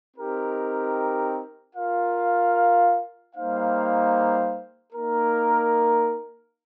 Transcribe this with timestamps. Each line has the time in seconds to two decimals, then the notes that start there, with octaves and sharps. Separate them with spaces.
0.17 C4 D#4 G4 A#4
1.75 F4 A#4 F5
3.34 G3 A#3 D#4 C5 F5
4.93 A#3 D#4 A#4